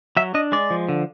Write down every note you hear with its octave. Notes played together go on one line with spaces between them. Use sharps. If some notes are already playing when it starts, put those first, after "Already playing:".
F#3 E5
D4 D#5
G#3 D5
F3
D3